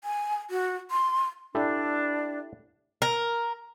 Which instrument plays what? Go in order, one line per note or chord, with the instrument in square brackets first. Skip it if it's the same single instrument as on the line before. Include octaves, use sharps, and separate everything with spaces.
[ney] G#5
F#4
C6
[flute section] D4 [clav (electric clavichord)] E4 G4 A4
[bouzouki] A#4